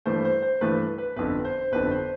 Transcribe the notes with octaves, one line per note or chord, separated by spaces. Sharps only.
G2 E3 A3 C5
C5
C5
G2 E3 A3 B4
B4
G1 F2 D3 B4
C5
G1 F2 D3 B4
C5